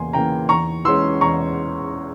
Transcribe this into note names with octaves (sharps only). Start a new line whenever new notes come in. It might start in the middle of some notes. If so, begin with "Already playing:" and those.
Already playing: E2 C#3 E3 A#3 G#5 C6
C#3 E3 A#3 G5 A#5
E2 A#5 C#6
E3 G#3 C#4 C6 E6
E2 A#5 C#6